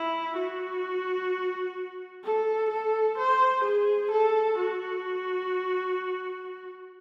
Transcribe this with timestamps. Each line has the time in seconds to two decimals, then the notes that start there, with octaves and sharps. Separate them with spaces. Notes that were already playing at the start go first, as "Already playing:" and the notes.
Already playing: E4
0.37 F#4
2.23 A4
2.70 A4
3.18 C5
3.64 G#4
4.12 A4
4.58 F#4